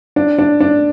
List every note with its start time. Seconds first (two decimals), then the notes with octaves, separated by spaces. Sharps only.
0.16 D4
0.38 D4
0.60 D4